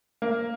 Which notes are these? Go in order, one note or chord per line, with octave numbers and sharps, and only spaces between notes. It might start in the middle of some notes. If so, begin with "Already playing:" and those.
A#3